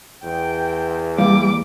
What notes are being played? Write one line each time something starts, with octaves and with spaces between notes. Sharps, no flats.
E2 G5
E3 G3 A#3 D6